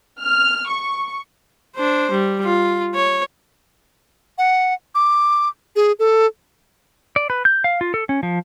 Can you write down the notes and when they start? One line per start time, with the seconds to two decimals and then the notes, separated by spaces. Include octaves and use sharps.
0.21 F6
0.69 C#6
1.76 D4 C5
2.11 G3
2.44 F4
2.95 C#5
4.38 F#5
4.95 D6
5.76 G#4
5.99 A4
7.16 D5
7.30 B4
7.45 G6
7.64 F5
7.81 F4
7.94 A4
8.09 C#4
8.23 F3